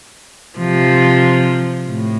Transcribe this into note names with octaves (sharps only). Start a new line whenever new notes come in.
C3 F3
A2